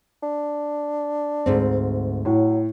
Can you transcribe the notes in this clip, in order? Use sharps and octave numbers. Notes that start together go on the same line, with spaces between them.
D4
D2 G#2 C4
A2 F#3